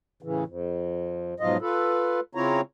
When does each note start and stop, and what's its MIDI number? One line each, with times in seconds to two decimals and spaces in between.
0.23 0.44 45
0.23 0.44 49
0.23 0.44 52
0.47 1.34 41
1.40 1.57 44
1.40 1.57 47
1.40 1.57 53
1.40 1.57 54
1.40 1.57 65
1.40 1.57 75
1.61 2.20 65
1.61 2.20 69
1.61 2.20 71
2.35 2.61 49
2.35 2.61 60
2.35 2.61 64
2.35 2.61 65
2.35 2.61 73
2.35 2.61 82